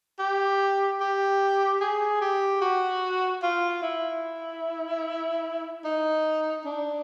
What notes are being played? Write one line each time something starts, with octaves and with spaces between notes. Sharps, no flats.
G4
G4
G#4
G4
F#4
F4
E4
D#4
D4